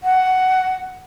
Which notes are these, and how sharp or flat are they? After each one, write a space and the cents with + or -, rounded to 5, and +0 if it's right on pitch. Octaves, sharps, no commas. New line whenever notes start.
F#5 +10